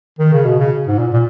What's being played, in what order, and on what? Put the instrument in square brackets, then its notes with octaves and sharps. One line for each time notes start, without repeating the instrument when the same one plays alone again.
[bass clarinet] D#3
C#3
B2
C#3
G#2
A#2
A#2